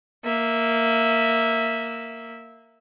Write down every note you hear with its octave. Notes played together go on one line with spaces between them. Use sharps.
A#3 E5